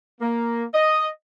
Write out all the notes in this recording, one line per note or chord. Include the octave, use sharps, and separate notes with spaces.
A#3
D#5